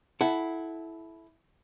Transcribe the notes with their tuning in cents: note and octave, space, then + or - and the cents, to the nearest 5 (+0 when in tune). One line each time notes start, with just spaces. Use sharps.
E4 +0 A4 -25 F#5 +5